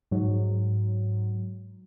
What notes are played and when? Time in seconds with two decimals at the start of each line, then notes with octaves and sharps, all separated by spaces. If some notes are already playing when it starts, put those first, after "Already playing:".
0.11 G#2 F#3